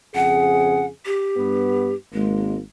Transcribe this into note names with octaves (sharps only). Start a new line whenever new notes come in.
F2 C#3 G#4 F#5
G4
G2 B3
G#1 G#3 A#3